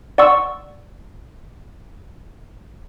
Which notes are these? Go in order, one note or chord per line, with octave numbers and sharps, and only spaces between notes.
D5 F#5 C6 C#6 E6